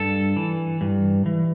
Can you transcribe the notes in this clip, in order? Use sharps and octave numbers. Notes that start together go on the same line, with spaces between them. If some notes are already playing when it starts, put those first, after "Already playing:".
Already playing: G2 A4
E3
G2
E3